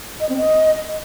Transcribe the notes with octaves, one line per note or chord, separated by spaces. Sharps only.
D#5
C4
D#5